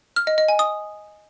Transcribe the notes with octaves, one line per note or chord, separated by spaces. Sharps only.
F6
D#5
D#5
G#5
D#6